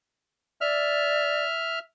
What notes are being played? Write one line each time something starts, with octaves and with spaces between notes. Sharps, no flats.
D5 E5 F6